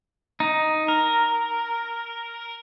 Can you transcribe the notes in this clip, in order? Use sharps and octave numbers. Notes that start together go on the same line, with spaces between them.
D#4
A#4